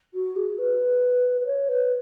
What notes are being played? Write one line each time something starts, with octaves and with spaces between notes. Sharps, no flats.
F#4
G#4
B4
B4
C#5
B4